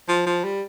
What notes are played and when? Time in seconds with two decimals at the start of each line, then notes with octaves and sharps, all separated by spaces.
0.09 F3
0.26 F3
0.44 G3